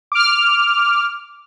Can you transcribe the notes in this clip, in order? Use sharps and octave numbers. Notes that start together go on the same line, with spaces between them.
D6 F6